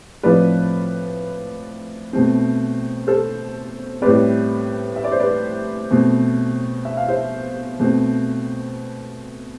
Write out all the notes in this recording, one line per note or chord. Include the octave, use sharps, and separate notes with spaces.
A2 F3 C4 B4 D5
B2 A3 C4
A4 C5
A2 G3 C4 B4 D5
E5
D5
C5
B4 D5
B2 A3 C4
E5
F5
C5 E5
B2 A3 C4